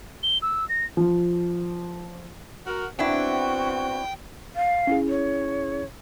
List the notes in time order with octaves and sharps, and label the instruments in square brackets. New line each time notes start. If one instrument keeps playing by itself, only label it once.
[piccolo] G7
E6
A#6
[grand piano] F3
[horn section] F#4 A#4
[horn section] B3 C4 F#4 [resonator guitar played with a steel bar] D4 E4 [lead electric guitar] G5
[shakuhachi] F5
[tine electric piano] C#4 E4 G#4
[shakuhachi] C#5